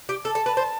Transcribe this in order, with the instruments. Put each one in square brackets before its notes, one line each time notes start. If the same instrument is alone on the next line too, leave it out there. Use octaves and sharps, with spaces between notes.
[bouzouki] G4
[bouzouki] A4 [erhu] A5
[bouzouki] A4
B4
C5